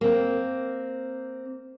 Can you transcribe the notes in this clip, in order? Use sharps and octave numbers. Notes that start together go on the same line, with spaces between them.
A#3 C4